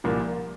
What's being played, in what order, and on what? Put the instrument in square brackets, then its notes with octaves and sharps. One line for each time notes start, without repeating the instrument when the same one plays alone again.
[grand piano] C2 A#2 F3 A#3